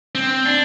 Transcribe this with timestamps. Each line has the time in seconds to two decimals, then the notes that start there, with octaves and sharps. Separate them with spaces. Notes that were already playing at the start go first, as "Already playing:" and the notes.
0.15 C4
0.45 D4